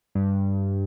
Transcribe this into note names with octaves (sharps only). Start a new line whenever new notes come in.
G2